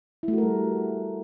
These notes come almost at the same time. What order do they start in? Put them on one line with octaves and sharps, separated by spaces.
E4 A3 F#4 A#4 G3